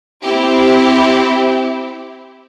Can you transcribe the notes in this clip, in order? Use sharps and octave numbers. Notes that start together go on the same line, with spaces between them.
C4 E4 G4